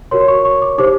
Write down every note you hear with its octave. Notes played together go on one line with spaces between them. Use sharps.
F#4 A#4 C#5 C6
C#6
C#6
D6
D#4 G4 C5 D6